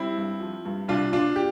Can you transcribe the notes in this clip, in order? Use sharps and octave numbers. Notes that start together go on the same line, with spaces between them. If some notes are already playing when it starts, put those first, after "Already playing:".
Already playing: G3 C4 E4
G2
F3
G2
C2 D4 F4
A#2 D4 F4
G4